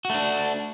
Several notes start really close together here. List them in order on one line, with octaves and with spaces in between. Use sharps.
F#4 A3 D4